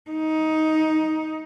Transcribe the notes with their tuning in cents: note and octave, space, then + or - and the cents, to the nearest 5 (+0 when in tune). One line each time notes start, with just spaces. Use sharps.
D#4 +15